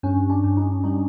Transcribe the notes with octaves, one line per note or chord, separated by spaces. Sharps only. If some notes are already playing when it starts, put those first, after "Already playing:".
G2 C#4
D4
G2
D#4
G3 D#4